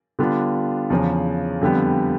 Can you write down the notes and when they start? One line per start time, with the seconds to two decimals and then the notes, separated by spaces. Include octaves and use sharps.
0.19 D3 G3 B3 D4 F4
0.90 E2 C#3 F3
1.61 F2 D3 G3 B3